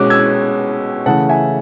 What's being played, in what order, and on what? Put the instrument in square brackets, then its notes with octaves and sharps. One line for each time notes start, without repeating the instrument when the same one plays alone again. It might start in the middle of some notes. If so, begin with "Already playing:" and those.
Already playing: [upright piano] B2 G#3 C#4 D6 F#6
E6 G#6
C#3 E3 A3 C#4 F#5 A5
E5 G#5